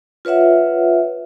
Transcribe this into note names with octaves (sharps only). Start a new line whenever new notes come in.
F4 B4 C#5 E5 F#5